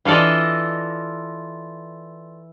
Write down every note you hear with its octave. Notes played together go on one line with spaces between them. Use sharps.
E3 F4 A4 D5 D#5